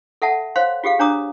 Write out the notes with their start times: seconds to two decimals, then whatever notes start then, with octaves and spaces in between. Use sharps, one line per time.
0.22 A4 E5 F#5 A5
0.56 C5 C#5 F5 C6
0.84 F4 G4 G#4 F5
0.99 D4 C#5 A#5 D6 D#6